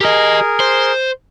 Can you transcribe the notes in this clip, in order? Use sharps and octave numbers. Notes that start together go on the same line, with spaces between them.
G4 G#4 A#4 D#5
C5